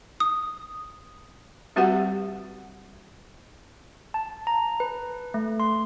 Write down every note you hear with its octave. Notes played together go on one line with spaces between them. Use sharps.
D#6
G3 C4 F#4 G4 B4 F#5
A5
A#5
B4
A3
C6